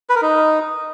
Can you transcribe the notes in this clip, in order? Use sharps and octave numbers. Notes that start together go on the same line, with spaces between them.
B4
A#4
D#4